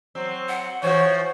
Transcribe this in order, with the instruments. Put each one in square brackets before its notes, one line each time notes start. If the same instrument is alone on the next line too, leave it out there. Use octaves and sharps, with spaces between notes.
[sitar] F#3 C4
[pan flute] F#5
[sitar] E3 F3 F#4 [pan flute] C5 [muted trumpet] C#5